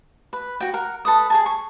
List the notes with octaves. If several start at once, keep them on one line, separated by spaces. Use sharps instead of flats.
B4
F#4 G5
A#4 F#5
A4 B4 D#6
G#4 G#5 A5
C#6